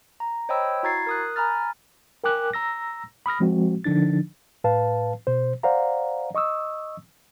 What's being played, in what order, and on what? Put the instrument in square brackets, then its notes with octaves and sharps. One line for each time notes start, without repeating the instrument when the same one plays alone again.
[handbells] A#5
C5 C#5 D#5 G5 B5 E6
E4 F#4 A#5 G#6 A6 C7
A#4 D#6 F#6
G#5 A#5 B5 F6 A6
[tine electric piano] A#4 G5 G#5 D6 F#6
A#5 E6 A#6
B5 D#6 F6 A#6
F3 G#3 C4 F#4
D3 F3 D4 D#4 A6
[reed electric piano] A2 B4 F5 A5
B2 C5
C5 D5 F5 F#5 A#5
D#5 C#6 D#6 E6